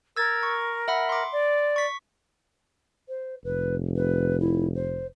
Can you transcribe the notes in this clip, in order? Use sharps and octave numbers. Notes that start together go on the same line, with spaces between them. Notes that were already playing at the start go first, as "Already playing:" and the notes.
A#4 E6 G#6 A6
C#6
E5 F#5 B5
C6 D6
D5
C#6 B6
C5
F1 B4
B4
E4
C5